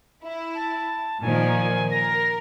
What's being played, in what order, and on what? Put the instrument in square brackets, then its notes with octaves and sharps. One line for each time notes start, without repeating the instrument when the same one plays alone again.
[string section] E4
[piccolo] A5
[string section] A#2 D#3 F3 [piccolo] G#5
[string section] A#4 [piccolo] A#6